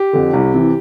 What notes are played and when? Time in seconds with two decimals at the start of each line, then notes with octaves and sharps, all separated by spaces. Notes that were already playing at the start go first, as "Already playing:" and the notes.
Already playing: G4
0.13 F2 D3
0.33 C2
0.54 C3 E3